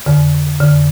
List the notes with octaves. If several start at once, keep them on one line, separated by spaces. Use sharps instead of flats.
F2 D3
F2 D3